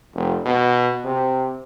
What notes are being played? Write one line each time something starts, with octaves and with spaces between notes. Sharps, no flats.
F1
B2
C3